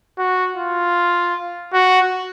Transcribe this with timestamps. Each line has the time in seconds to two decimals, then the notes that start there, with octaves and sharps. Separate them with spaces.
0.18 F#4
0.57 F4
1.73 F#4